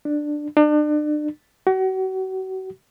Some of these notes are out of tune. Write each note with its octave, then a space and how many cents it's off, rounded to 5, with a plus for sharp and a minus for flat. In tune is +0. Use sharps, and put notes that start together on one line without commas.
D4 +10
D4 +35
F#4 +35